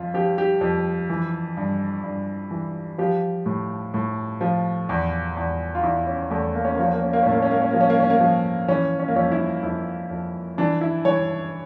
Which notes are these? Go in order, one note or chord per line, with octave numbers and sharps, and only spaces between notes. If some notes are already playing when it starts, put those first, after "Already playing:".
Already playing: F2 F4
F3 G4
G4
F2
E3
G2
G2
E3
F3 G4
A2
A2
F3
E2
E2
F4
E2 E4
C#4
E2 A3
A#3
C#4
F3 A#3
C#4
A#3
C#4
A#3
A2 C#4
A#3
C#4
A#3
C#4
F3 A#3
C#4
A#3
C#4
A#3
F3
E3 C#4
C#4
A#3
F2 C#4
E4
F2 E4
F2
E3 D4
E4
E3 C#5